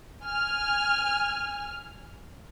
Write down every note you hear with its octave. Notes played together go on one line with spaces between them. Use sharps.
G#5 F6